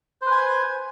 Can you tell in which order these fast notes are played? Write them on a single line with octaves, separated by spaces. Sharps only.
C5 B4 G#5